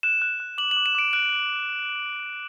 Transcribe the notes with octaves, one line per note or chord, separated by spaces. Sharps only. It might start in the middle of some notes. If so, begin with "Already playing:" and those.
F#6 E7
F#6
F#6
D6 F#7
F#7
D6
E7
D6 D7
F#6 D7